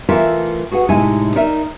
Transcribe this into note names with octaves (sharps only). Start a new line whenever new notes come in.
E3 A3 F4 A4 A#4 E5
F#4 G#4 B4 F#5
A2 C3 G#3 D#4 E4 G#5
D#4 A#4 D5 E5